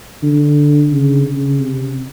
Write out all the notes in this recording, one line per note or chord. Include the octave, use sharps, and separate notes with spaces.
D3
C#3
C#3
C3